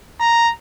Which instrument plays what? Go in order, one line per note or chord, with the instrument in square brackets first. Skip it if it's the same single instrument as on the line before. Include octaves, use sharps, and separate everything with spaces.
[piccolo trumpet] A#5